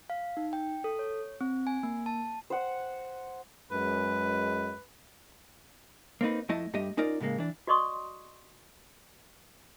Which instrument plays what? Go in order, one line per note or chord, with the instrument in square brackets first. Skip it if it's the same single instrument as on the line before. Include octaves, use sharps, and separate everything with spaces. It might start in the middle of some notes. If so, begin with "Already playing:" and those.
[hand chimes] F5
D#4
G5
A4
C#5
C4
G#5
A#3
A5
[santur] C5 F#5
[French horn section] F#2 G#3 [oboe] B4
[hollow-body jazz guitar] A#3 C4 D#4 B4
F2 A3 E4 D#5 A5
G2 A3 G4 D#5
C#4 D#4 F4 A#4 D5
A2 C#3 G#3 A#3
E3 D4
[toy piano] F#4 D5 D#5 C6 C#6 D#6